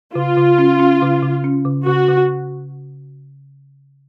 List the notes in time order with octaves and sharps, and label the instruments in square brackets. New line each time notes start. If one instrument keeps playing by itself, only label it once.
[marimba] C#3 [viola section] F4
[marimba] C#3
C#4
C#4
C#3
C#3
C#4
C#3
[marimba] C#3 [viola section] F#4
[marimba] C#3